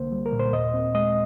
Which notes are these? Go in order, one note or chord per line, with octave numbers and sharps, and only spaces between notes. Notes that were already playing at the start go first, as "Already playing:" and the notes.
Already playing: C2 D3 A#3 C5
G3
A#4
A#2
C5
D#2 D#5
C4
G#3 D#5